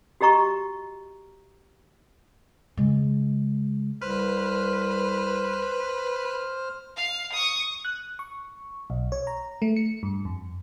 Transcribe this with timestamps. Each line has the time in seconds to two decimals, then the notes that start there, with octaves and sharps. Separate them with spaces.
0.21 F#4 G4 D#5 A#5 C#6
2.77 C#3 G#3
4.01 C2 B4 C5 F6
6.96 F5
7.33 C#6 D#6
7.85 F#6
8.19 C#6
8.90 B1
9.12 C#5
9.27 A#5
9.62 A3
9.76 C#7
10.03 G2
10.25 F2